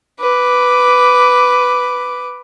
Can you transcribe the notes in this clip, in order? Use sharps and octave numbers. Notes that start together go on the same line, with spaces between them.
B4 D6